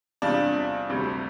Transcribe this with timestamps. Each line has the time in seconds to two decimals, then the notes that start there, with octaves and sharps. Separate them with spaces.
0.22 E2 C3 G3 D4 F4
0.90 D2 C3 G3